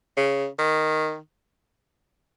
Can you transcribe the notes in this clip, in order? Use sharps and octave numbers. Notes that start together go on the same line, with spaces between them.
C#3
D#3